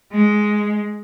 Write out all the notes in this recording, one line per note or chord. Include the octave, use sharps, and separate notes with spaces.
G#3